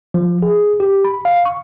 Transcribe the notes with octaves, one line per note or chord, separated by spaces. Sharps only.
F3
G#4
G4
B5
F5
C#6